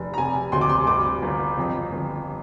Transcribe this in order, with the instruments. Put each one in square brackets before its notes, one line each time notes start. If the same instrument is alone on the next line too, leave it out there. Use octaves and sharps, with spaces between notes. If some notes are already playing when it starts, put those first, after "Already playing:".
Already playing: [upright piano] F1
A#5
C3 G#5
D2 C6
D6
C6
G2 D6
G1
F2
G1